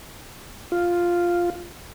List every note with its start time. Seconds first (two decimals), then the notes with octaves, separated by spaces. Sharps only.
0.72 F4